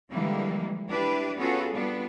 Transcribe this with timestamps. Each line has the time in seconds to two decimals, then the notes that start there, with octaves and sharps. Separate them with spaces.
0.11 D3 E3 F3 G3 G#3 A#3
0.89 D4 E4 G4 B4 D5
1.37 B3 C#4 F4 F#4 G#4 A4
1.72 G3 B3 D4 F4